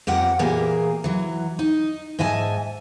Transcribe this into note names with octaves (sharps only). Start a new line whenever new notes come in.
F2 G4 A#4 F#5
A#2 E3 A#3 G4 G#4 A#4
E3 F#3
D#4
G#2 D#5 E5 G#5 A5